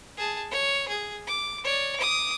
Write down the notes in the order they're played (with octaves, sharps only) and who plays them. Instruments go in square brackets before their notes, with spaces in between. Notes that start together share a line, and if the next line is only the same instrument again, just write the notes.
[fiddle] G#4 A5
C#5
G#4
D6
C#5 D5
D6 D#6